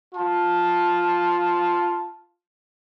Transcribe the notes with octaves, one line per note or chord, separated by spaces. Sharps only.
F4 A5